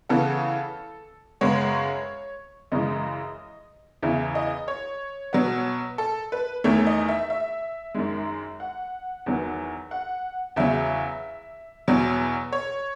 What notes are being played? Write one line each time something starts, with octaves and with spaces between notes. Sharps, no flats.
C#3 E3 B3 A4
F#2 C#3 G#3 B3 C#5
F#2 C#3 E3 G#3 D#5
E2 C#3 E3 E5
D#5
C#5
B2 F#3 B3
A4
B4
E2 D#3 A3 C#5
D#5
E5
E5
F#2 D#3 G#3
F#5
E2 D#3 F#3 B3
F#5
E2 C#3 F#3 E5
E2 B2 F#3
C#5